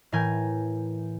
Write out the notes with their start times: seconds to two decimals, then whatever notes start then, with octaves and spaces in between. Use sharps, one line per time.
0.12 A2 E3 A#4 G#5 G6